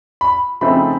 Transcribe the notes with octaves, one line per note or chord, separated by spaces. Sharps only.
B5
C#3 F3 A3 C4 D#4 B5